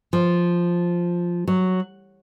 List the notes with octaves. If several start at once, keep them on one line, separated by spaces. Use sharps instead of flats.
F3
F#3